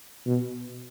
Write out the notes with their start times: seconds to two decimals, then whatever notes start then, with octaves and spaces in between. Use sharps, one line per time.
0.25 B2